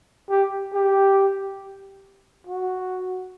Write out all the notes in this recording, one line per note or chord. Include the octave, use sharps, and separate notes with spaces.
G4
G4
F#4